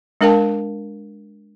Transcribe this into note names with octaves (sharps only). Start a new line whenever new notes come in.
G#3 D4 A#4 F5 G5 A5